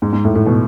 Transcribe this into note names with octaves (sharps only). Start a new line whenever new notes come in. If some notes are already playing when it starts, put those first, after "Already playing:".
G#2
G#2
A2
A2
B2